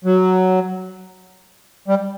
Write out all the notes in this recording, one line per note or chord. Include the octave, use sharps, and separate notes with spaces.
F#3
G3